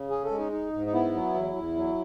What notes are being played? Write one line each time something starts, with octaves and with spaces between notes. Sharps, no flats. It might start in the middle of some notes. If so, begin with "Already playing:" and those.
Already playing: C#3
C#4 G#4
A4
G#3
D#4
D#4
G#2
D#4
B3 E4
F#3
E2
E2
F#3